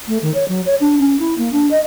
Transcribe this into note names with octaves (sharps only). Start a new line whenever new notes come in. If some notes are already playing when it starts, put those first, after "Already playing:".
A3
D#3
C#5
F#3
C#5
D4
C#4
E4
A#3
D4
D#5